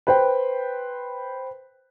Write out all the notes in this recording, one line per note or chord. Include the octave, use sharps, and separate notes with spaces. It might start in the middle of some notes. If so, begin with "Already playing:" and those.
B4 C5 G5